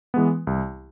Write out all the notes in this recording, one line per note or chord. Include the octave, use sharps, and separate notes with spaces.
E3 G#3 B3
C2